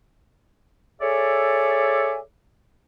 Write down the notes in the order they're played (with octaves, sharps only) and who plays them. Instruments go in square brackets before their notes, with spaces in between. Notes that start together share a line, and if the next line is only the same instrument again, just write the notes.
[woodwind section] G#4 A4 C#5 D5 E5 G#5